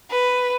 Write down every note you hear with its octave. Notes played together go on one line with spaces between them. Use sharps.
B4